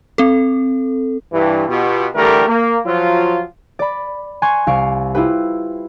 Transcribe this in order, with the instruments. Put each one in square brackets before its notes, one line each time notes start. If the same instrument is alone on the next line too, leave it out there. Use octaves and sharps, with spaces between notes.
[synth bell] C4 A4
[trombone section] G2 E3
B2 F4 G4
D3 E3 G3 A3 G4 A#4
A#3
F3 F#3 F4
[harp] D5 B5
G#5 C6 C#6 F#6 G#6
C2 F5 C#6 D7
E4 F4 G4 B4